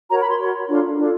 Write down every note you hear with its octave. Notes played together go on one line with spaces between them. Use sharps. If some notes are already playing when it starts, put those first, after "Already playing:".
F#4 A#4 C#5 A#5
B5
C6
F#4 A#4 C#5
D4 F4 A4
D4 F4 A4